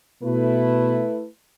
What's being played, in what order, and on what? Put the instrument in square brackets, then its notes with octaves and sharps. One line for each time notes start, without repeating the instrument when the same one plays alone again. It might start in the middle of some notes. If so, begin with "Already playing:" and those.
[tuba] B2 [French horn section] A3 E4 B4